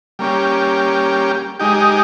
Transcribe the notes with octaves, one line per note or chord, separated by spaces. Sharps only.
G3 A#3 C#4 G4
G#3 D#4 G4